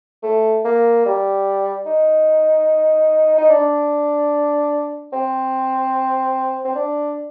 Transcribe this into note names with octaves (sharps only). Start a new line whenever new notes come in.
A3
A#3
G3
D#4
D#4
D4
C4
C4
D4